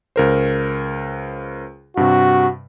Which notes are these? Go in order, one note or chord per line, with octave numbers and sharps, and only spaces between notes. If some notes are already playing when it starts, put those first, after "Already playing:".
C#2 A#4 C5
G2 C3 F#4